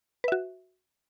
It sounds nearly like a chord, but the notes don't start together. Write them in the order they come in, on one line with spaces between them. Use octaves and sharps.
B4 E5 F#4